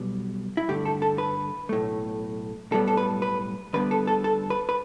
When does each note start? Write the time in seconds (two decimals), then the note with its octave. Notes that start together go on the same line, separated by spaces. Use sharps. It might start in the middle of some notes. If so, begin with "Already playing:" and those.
Already playing: B1 B2 G3 B3
0.57 E4
0.68 G2 D3 A3 G4
0.85 A4
1.02 A4
1.18 B4
1.69 B1 A2 A3
2.71 B1 A2 G3 B3 A4
2.88 A4
2.97 B4
3.22 B4
3.73 D2 D3 G3 B3 B4
3.91 A4
4.07 A4
4.24 A4
4.50 B4
4.69 B4